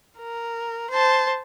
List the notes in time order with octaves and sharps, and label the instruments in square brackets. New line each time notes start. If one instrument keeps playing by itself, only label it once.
[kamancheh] A#4
C5 A5